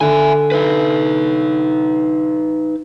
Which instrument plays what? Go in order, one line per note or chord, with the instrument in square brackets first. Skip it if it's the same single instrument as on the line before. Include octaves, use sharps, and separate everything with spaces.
[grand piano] D3 [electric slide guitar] E5 G#5
[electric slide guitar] D#4 B4